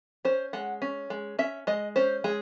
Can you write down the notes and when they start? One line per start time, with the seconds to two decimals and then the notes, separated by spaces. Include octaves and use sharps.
0.25 C#4 C5
0.53 G#3 F#5
0.82 C#4
1.10 G#3
1.39 C#4 E5
1.67 G#3 D#5
1.96 C#4 C5
2.24 G#3 G#4